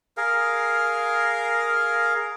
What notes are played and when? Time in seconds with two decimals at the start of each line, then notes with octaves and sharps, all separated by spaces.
0.17 G#4 A#4 F5